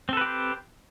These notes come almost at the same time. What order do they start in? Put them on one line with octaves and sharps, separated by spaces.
C4 A4 B4 G4 C5